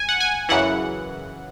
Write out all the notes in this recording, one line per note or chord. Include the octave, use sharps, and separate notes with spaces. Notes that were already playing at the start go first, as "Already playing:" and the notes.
Already playing: G#5
F#5
G#5
F#2 C#3 E3 F#5